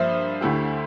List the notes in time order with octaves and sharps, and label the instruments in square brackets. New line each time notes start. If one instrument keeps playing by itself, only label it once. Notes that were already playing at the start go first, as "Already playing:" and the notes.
Already playing: [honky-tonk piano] G2 F3 A#3 [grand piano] C5 E5
[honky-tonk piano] D2 D3 A3 E4 G4